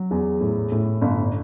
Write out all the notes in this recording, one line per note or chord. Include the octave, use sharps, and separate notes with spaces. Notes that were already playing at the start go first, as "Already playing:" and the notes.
Already playing: F#3
E2
A2
A2
G1